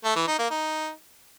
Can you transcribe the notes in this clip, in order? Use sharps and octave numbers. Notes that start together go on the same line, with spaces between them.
A3
E3
D#4
A#3
D#4